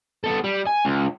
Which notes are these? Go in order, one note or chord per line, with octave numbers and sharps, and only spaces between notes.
B3 A4
G3
G#5
C#2